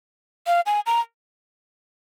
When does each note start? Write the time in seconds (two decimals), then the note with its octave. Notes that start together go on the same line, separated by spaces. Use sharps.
0.47 F5
0.66 G#5
0.86 A#5